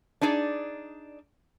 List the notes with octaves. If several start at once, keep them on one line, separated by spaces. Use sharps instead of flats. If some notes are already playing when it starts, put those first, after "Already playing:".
D4 D#4 G#4 D5